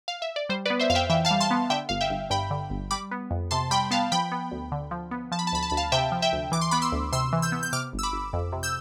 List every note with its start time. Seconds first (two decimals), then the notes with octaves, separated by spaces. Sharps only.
0.08 F5
0.22 E5
0.36 D5
0.49 G3 C5
0.65 B4 D5
0.70 B3
0.80 C5 E5
0.90 F2 F5
0.95 E5 G5
1.10 E3 E5 G5
1.25 F5 A5
1.31 G3
1.40 A5 C6
1.51 B3
1.70 D3 E5 G5
1.89 G1 F5
2.01 E5 G5
2.10 G1
2.30 G2 G5 B5
2.51 D3
2.70 G1
2.91 G3 B5 D6
3.11 B3
3.31 F2
3.51 C3 A5 C6
3.71 G3 G5 B5
3.91 B3 F5 A5
4.12 F3 G5 B5
4.32 B3
4.52 D2
4.72 D3
4.91 F3
5.11 B3
5.32 F3 A5
5.39 B5
5.47 A5
5.52 D2 B5
5.63 A5
5.70 D2 B5
5.77 F5 A5
5.92 C3 E5 G5
6.12 F3
6.22 E5 G5
6.33 D2
6.52 E3 D6
6.61 C6
6.71 B3 B5 D6
6.82 C6 E6
6.92 D2
7.13 C3 C6 E6
7.33 E3
7.42 E6 G6
7.52 B3
7.63 G6
7.73 C3 D6 F6
7.93 G1
7.99 E6
8.03 B5 D6
8.13 G1
8.33 F2
8.52 C3
8.63 E6 G6